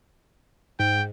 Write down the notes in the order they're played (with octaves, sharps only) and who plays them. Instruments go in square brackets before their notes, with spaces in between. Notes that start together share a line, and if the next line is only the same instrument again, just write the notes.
[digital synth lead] G#2 [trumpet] G5